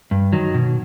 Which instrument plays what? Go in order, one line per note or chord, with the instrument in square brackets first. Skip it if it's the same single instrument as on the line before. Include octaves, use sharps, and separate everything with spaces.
[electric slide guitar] G2
D#3 F#3
B2